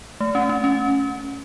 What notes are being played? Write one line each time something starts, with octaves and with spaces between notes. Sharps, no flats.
A3
C#4
C#4
C#4